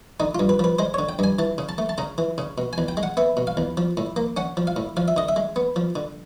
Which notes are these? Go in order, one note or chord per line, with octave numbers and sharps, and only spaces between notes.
D3 D#4
G2 F4
B4
F3 B4
G#3 C5
D3 C#5
G5
G2 G#5
E3 A5
C#3
A5
A3
A5
C#3 A#5
E3
C#3
B2
G#5
E2
G5
G#3
F#5
B3 E5
B2
F5
E2
F3
A2
A#3
C#4 F#5
F3
F5
A2
F3 F5
E5
D3 D#5
E5
G#3
B3
F3
D3